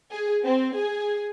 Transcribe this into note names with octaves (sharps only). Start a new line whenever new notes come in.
G#4
C4
G#4